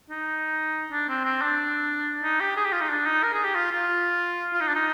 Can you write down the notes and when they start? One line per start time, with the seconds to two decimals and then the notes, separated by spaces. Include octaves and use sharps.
0.10 D#4
0.92 D4
1.09 C4
1.25 C4
1.42 D4
2.23 D#4
2.40 G4
2.57 G#4
2.65 G4
2.73 F4
2.81 D#4
2.89 D4
3.06 D#4
3.23 A#4
3.33 G#4
3.44 G4
3.55 F4
3.71 F4
4.53 F4
4.61 D#4
4.68 D4
4.75 D#4